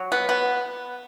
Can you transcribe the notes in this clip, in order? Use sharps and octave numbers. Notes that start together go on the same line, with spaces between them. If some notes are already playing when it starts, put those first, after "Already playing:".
Already playing: F#3
B3
B3